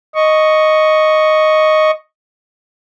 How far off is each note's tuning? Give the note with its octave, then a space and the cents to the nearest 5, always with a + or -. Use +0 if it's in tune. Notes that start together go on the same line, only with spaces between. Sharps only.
D#5 +0 C#6 +0